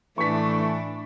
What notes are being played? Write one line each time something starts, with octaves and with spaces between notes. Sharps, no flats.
A2 E3 A3 D4 C#6 B6